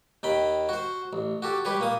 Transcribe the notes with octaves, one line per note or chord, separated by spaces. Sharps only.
D#2 D#3 G5 B5
F#4 C5
A1
F#4 G4 A4
G3 G4 B4 C#5
A#2 A#3 D#6